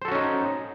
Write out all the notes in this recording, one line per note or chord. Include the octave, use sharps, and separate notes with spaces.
C#4 D#4 F#4 A4 C5